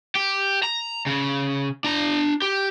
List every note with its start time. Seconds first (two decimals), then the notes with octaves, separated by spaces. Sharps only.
0.15 G4
0.63 A#5
1.06 C#3
1.84 D4 A#5
2.42 G4